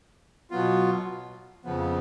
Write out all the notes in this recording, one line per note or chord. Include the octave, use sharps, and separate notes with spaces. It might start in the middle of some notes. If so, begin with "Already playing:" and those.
B2 F#3 B3 F4
F2 C#3 F3 B3